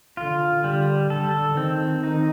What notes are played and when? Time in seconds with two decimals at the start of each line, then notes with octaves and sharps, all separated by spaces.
0.17 D3 F4
0.64 D3 G3
1.10 D3 A4
1.56 D#3 C4
2.03 D#4